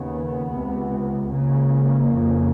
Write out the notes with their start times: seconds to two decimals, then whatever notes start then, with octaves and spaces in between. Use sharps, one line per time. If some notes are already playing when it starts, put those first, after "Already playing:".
Already playing: D#2 C#3 B3
0.53 C#2 C3
1.30 C#2 C#3 A#3
2.07 F2 C#3